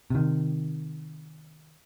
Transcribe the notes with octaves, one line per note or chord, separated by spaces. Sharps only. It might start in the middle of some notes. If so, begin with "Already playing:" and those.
C3 D#3